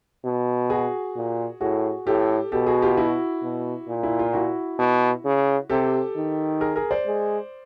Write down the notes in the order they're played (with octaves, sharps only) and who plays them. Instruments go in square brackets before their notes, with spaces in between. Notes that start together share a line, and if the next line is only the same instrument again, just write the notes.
[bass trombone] B2
[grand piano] F#4 G#4
[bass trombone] A#2
[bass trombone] A2 [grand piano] F#4 G#4
[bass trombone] A2 [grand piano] G4 A4
[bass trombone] B2 [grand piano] G4 A4
[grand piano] F#4 G#4
F4 G4
E4 F#4
[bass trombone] B2
A#2
[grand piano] E4
F4
E4 F#4
[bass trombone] B2
C#3
[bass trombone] C3 [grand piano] G4 A4
[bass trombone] D#3
[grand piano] G#4 A#4
G#4 A#4
C5 D5
[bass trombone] G#3